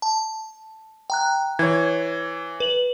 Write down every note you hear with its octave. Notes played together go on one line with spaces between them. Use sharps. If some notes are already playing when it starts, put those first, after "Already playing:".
A5
G5 A#5 F#6
E3 C#5 G#6
B4 F#7